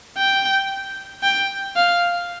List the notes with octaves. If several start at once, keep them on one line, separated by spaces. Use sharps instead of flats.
G5
G5
F5